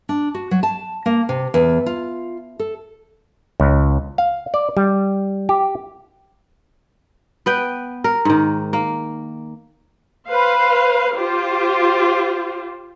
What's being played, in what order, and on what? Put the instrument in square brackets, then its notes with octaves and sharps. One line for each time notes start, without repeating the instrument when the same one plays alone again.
[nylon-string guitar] D4
F#4
F#3
A5
A#3
C3
E2
F4
A4
[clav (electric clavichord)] C#2
F5
D5
G3
G4
[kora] B3 B4 G5
A#4
G#2 D#3
A#3
[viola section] B4 C5 F5
F4 G4 C5